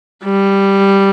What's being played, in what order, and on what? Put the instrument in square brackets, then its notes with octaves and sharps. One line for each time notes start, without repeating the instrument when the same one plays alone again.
[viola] G3